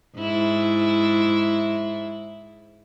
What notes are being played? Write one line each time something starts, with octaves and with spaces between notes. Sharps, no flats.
G#2 E4